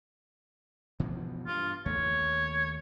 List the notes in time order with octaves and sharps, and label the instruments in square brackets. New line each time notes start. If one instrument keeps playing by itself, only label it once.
[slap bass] B2 E3 F3
[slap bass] G2 [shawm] F4
[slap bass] D#2 A3 [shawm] C#5